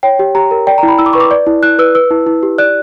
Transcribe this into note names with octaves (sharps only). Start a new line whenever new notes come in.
C#5 G5
G4
G4 A#5
A#4
D5 G5
A#5
E4
B5
E4 E6
D6
B4 C#6
D6
D5
E4
E4 F#6
B4 E6
B4 E6
E4
E4
G4
D5 F#6